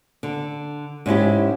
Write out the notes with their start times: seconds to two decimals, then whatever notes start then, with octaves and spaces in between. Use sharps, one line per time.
0.23 D3
1.06 G#2 C#4 E4 G4